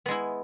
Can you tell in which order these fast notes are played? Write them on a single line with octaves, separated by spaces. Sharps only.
B3 G#3 E4